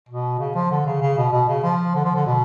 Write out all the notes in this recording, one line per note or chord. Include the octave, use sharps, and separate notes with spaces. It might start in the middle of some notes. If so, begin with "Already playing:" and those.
B2
C#3
F3
D3
C#3
C#3
B2
B2
C#3
F3
D3
F3
D3
B2